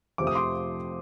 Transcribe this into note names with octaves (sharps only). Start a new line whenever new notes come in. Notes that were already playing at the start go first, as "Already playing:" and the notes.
F2 C3 F3 A3 C4 D6
D#6
C6 D6